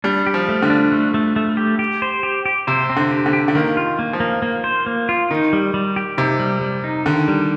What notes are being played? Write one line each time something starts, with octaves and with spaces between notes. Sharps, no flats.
G3 D4
G4
F3
A3
D3
D4
A3
A3
A3
G4
G4
C5
G4
G4
C3 C5
C4
D3
G4
D3
G4
D3
D#3 A#3
F4
A#3
F3
A#3
A#3
C5
A#3
F4
D#3 D#4
G3
G3
G4
C3 D#4
G3
G3
D#4
D3 D#3
G3